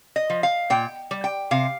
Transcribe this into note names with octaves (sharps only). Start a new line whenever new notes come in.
D#5
F3
F5
A#2 G5
G3
G5
C3 F5